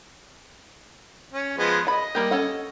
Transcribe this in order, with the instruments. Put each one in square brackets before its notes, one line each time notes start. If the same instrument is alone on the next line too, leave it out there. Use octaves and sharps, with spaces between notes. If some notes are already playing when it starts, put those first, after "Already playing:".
[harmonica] C#4
F3 G#3 B3
[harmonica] D#5 [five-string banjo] A5 B5
[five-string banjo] G3 A#3 G4
C#4 A4 F#5